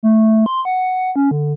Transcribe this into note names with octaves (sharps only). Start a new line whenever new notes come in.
A3
C6
F#5
C#4
D3